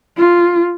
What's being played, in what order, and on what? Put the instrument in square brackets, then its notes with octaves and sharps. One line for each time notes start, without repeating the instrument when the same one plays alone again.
[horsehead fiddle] F4